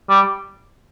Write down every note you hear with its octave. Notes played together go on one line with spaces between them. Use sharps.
G3